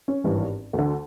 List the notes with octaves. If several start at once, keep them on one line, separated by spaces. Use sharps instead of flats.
C#4
G#1 G2 E3
D2
D3